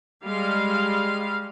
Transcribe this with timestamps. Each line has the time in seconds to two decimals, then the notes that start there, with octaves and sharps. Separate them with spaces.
0.23 G3 G#3 F5